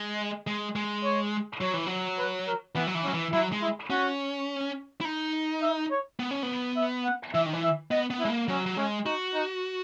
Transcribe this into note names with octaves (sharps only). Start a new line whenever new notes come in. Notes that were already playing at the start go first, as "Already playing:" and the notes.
Already playing: G#3
G#3
G#3
C#5
F#3 C#5
E3
F#3
B4
A#4
E3 B3
F#3
E3
F#3 C#4
E3
F#3 E4
G#3
E4
C#4 F#4
E4
D#4
E5
C#5
B3
C#4
B3
E5
F#5
E3 E5
D#3
E3
E5
B3 D#5
B3
E4
G#3
A#3
F#3 C#4
F#3
G#3 C#4
D#4 F#4
D#4